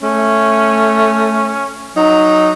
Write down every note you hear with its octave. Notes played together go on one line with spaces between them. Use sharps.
A3 C#4
F#3 D#4